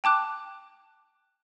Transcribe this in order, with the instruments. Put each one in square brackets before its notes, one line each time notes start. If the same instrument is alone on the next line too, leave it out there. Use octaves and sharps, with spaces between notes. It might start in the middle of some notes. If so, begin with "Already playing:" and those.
[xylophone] G5 A5 D6 F#6